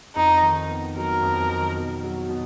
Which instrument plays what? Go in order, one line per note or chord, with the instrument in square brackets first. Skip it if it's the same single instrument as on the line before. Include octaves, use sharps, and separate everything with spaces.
[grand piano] F2 [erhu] D#4
[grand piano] D#3
B3
[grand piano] F#3 [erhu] A#4
[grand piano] F2
D#3
B2
F#3
B2